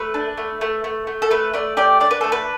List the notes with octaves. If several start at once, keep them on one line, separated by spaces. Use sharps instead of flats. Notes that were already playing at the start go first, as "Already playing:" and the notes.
Already playing: A3 B4
D4
A3
A3
A3
A3
A4
A3 B4
A3 D5
G4 D5
D4 D5
B4
A3 A4
B4